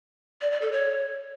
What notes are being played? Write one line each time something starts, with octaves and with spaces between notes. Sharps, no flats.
D5
D5
A4
C#5